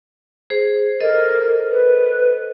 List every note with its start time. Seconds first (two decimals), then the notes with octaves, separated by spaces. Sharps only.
0.50 G#4 C5
1.01 A4 A#4 C5 D#5
1.69 B4